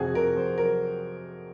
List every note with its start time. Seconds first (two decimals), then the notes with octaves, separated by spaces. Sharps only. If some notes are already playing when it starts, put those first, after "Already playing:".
Already playing: F2 C3 F#4 G#4
0.14 C3 A#4
0.35 F2 C5
0.58 F#3 A#4